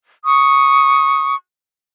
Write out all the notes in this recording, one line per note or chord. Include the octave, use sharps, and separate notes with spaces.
C#6 D#6